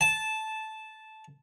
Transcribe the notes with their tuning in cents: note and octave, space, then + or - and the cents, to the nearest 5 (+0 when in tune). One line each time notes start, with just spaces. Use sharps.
A5 -10